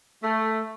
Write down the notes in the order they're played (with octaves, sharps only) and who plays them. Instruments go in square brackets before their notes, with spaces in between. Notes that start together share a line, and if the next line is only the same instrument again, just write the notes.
[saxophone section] A3